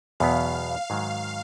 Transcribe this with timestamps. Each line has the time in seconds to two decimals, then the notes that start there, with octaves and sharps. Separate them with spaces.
0.20 E2 B2 F#3 B3 F5
0.90 G#2 D#3 F#3